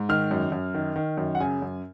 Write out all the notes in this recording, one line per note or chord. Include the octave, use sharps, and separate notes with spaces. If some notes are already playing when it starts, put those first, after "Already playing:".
Already playing: G#2
D#3 F6
F#2
F#2
D#3
D#3
F#2
F#5
C#3 G#5
F#2